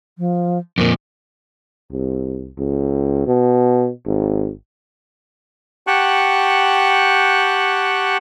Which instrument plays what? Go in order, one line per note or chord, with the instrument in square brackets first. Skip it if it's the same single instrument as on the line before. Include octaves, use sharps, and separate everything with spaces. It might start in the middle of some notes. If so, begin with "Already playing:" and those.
[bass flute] F3
[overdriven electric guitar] F2 A#2 [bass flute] A#4
[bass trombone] C2
C#2
B2
G#1
[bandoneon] G4 F#5 G5 A5 C#6 F#6